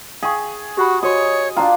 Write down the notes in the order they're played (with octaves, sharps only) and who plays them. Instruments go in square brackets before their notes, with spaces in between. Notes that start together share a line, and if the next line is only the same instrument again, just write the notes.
[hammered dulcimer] G#4 [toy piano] F5 G5 C#6
[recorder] F#4 [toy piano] G4 F#5 B5
[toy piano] F#4 C5 C6 [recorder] C#5 [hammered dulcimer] D#5
[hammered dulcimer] D4 F4 [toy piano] G5 A#5